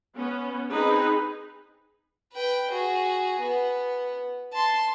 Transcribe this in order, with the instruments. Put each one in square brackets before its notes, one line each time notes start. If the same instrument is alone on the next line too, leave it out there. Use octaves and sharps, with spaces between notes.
[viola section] B3 C#4
C4 D#4 G#4 B4
[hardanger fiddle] B4 G5
F#4 G#4
B3
A5 C6